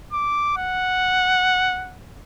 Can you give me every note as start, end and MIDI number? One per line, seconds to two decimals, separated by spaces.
0.13 0.53 86
0.57 1.96 78